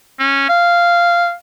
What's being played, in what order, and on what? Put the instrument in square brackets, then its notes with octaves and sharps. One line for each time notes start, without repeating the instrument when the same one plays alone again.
[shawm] C#4
F5